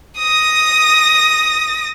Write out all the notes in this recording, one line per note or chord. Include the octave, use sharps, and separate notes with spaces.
D#6 A#6